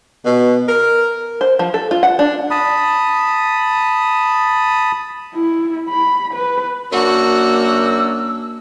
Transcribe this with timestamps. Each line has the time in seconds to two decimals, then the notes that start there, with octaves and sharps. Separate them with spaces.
0.25 B2
0.69 A#4
1.41 C5
1.59 F3
1.74 A4
1.91 F4
2.03 F#5
2.19 D4
2.51 A5 B5 D#6
5.35 E4
5.89 B5
6.34 B4
6.92 F#2 A#3 D4 F#4 E6